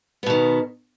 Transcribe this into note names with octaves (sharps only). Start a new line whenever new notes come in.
B2 D#3 B3